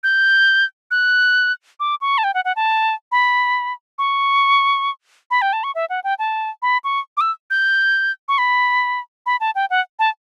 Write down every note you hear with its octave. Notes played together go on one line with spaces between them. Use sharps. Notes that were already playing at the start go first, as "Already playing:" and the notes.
G6
F#6
D6
C#6
A5
G5
F#5
F#5
A5
B5
C#6
B5
G5
A5
C#6
E5
F#5
G5
A5
B5
C#6
D6
E6
G6
C#6
B5
B5
A5
G5
F#5
A5